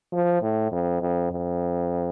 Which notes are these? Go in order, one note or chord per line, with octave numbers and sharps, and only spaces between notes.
F3
A2
F2
F2
F2